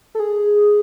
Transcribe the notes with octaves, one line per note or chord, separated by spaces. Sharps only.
A4
G#4